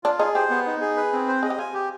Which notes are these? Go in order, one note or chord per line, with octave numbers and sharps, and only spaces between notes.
D4 F4
D#4 G#4
G4 C5
B3
D#4
G#4
B4
C4
C5
G#4 D#5
G4
F4 G#5
G4